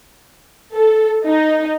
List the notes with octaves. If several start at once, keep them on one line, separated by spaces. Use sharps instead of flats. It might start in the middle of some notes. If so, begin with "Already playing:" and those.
A4
D#4